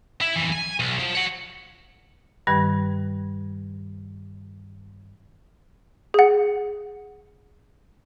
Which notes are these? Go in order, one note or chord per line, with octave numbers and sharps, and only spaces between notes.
E4
F2 E3
G#5
B1
F3
C#5 F#5
G2 D#3 G3 B4 G#6
G#4 F#5